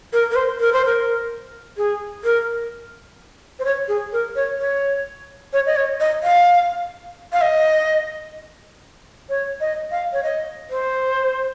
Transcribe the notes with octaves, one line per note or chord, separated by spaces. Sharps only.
A#4
A#4
C5
A#4
C5
A#4
G#4
A#4
C5
C#5
G#4
A#4
C#5
C#5
C#5
D#5
C#5
D#5
F5
F5
D#5
C#5
D#5
F5
C#5
D#5
C5